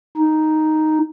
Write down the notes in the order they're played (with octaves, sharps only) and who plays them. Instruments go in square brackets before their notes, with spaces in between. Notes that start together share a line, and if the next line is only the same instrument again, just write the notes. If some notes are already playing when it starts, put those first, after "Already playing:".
[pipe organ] D#4